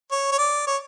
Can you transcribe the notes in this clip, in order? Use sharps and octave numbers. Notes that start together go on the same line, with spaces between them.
C#5
C#5
D5
C#5